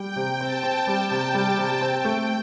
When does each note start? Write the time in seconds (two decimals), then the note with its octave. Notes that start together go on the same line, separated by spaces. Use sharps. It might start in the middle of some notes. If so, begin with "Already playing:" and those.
Already playing: G3 G5
0.16 C3
0.40 C4 A5
0.63 C4
0.87 G3
1.11 C3
1.34 G3
1.57 C3
1.80 C4 G5
2.04 A3